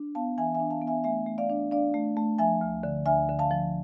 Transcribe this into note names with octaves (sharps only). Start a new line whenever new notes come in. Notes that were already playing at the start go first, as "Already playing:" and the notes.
Already playing: D4
B3 F5 A5
E3 E5 G#5
E5 G#5
D4
F5 A5
B3
E5 G#5
A3 E5 G#5
A3
D5 F5
D4
D4 D5 F5
A3
A3
F3 E5 G#5
D2
D3
D2 E5 G#5
D3
F5 A5
F3